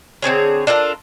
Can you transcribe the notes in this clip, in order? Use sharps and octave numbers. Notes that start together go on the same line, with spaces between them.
D3 C4 G#4 C#5
D4 F4 A4 A#4